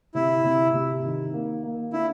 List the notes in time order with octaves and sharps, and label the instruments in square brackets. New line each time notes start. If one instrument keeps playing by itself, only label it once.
[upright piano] C3 [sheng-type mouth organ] E4
[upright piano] C3
C3
D#3
A#3
A#3
[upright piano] D3 [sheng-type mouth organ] E4